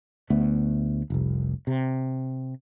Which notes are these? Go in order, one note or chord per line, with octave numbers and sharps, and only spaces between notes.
D2 A3 B3
F1 C2
C3